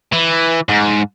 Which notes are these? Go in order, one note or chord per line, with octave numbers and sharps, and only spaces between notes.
E3
G#2